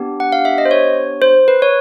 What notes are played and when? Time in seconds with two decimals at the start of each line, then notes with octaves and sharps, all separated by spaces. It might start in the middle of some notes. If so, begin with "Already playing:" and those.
Already playing: B3 D4 G4
0.20 F#5
0.32 F5
0.45 E5
0.58 D#5
0.65 C5
0.71 C#5
1.22 C5
1.48 B4
1.62 C#5